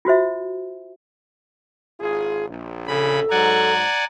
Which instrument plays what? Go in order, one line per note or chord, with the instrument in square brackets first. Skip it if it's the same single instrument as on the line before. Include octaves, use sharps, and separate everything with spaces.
[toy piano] F4 F#4 C5 E5
[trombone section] G#1 F4 G#4
A#1
[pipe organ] C#3 B5 [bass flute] A4
[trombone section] G#2 F#3 [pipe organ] D5 F#5 G#5 [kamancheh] A#5